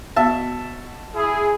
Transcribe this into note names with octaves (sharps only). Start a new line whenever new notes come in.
B2 E5 A5
E4 G#4